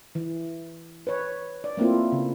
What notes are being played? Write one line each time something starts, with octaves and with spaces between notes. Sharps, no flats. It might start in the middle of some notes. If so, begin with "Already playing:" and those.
E3
B4 C#5
D5
A3 A#3 C4 E4 F4
C#3